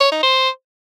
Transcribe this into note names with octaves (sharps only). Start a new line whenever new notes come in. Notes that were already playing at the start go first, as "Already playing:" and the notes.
C#5
D#4
C5